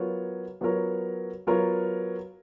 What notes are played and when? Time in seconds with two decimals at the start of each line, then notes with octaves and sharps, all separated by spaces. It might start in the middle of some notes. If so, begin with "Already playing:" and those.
Already playing: F#3 B3 F4 A#4 C#5
0.61 F#3 B3 F4 A#4 C#5
1.47 F#3 B3 F4 A#4 C#5